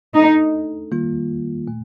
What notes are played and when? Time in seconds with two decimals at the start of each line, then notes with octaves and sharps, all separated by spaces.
0.15 A3 D4 D#4 A4
0.91 D#3 G3 A#3 F4
1.68 A#2 A3